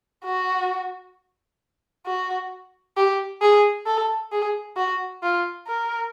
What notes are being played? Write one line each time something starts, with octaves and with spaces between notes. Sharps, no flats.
F#4
F#4
G4
G#4
A4
G#4
F#4
F4
A#4